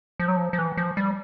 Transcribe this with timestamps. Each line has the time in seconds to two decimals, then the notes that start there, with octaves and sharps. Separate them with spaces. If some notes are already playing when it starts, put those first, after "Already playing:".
0.20 F3
0.28 F#3
0.36 F3
0.53 F3
0.58 E3
0.77 F3
0.97 G3